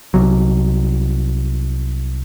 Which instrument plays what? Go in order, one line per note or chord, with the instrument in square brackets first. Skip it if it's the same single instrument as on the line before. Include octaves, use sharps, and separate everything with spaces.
[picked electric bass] C2 F#3